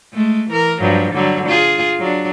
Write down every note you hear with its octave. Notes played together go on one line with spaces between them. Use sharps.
G#3 A3
E3 A#4
G2 F3 F#3
D3 F#3 G3
F4 G#4
F#3 D4